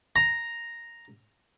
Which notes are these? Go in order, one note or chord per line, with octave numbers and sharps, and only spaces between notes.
A#5